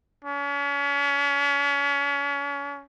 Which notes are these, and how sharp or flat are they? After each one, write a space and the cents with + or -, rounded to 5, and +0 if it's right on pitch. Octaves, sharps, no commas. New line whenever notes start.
C#4 +35